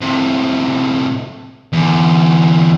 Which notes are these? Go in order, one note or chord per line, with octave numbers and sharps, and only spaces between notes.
A2 C3
E2 D3